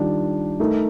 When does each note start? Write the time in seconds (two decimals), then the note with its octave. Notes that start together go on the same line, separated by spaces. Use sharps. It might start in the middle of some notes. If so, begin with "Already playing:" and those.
Already playing: D#3 G3 D4 F4
0.60 A3 D#4 A#4